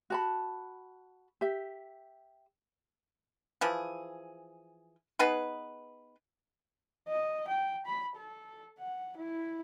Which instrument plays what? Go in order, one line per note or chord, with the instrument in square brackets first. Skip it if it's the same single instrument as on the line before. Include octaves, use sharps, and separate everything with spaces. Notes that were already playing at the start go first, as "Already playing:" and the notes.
[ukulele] F#4 A5 B5
G4 E5
[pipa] E3 F3 G#4
B3 D#4 G#4 B4
[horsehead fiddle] D#5
G5
B5
A4
F#5
E4